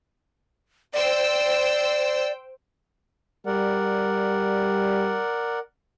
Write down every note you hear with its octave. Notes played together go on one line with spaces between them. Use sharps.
C5 D5 G5 E6
G3 A#4 D5 F#5